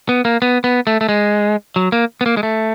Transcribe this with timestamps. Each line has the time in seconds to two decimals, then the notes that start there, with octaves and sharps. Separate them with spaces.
0.09 B3
0.25 A#3
0.42 B3
0.64 B3
0.87 A3
1.01 A3
1.09 G#3
1.76 F#3
1.92 A#3
2.21 B3
2.26 A#3
2.37 G#3
2.43 A3